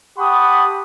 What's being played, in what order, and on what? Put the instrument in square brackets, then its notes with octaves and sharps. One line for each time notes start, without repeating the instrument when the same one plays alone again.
[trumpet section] G4 F#5 A5 B5 C#6 D#6